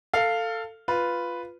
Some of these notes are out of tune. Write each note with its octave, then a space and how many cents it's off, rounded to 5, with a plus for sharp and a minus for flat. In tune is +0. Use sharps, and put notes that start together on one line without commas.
A4 +20 F5 -5
F4 +0 B4 +0